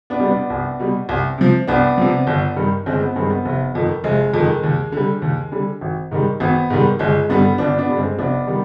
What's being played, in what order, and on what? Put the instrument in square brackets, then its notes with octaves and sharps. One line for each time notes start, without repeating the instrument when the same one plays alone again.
[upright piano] B3 D4
B2 G3
B3 D4
C2
B2 G3
C2
C3 F3
C2 B3 D4
C3 F3
G1
G2 D#3 G3
G1 G#3 C4
B3
G2 D#3 G3 G#3 C4
B3
F1
F2 D#3
F1 G#3
F2
D#3
D#2
D3 G3
D#2
D3 G3
G#1
G#2 D#3 G3
G#1 B3
G#2 D#3 G3
G1 G#3
G2 D3 G3 B3
G1 B3 D4
B3 D4
G2 D3 G3
G#3 C4
F1 B3 D4
D#3 G3